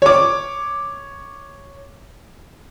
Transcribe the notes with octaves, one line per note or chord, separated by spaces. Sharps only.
C#5 D6